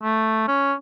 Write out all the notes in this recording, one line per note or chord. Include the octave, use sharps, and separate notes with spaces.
A3
C#4